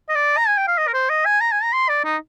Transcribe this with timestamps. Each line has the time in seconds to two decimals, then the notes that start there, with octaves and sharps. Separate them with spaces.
0.09 D#5
0.15 D5
0.38 A#5
0.48 G#5
0.58 G5
0.68 F5
0.78 D#5
0.88 A#4
0.94 C5
1.10 D#5
1.26 G#5
1.41 A#5
1.52 G#5
1.63 A#5
1.73 C6
1.89 D5
2.05 D#4